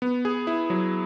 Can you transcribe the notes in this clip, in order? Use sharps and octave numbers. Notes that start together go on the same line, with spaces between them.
B3
G#4
E4
F#3